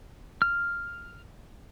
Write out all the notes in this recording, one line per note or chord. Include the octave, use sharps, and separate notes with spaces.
F6